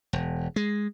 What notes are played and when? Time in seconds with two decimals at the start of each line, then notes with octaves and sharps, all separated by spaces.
0.13 E1
0.56 G#3